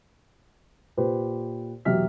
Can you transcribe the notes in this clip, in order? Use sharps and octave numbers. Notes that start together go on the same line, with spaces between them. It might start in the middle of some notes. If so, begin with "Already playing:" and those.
A#2 G4 B4 C5
E1 F#3 G4 E5 F6 B6